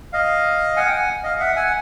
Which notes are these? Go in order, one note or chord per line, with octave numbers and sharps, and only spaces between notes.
D#5 F5
F#5 G#5
G5
F#5 G#5
D#5 F5
E5 F#5
F#5 G#5